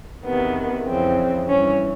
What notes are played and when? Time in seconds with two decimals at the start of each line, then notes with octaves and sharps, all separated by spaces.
0.24 E2 C3 D#3 B3
0.86 F2 C#3 E3 C4
1.48 G2 E3 C#4